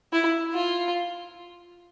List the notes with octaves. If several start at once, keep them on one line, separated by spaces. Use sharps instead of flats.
E4
F4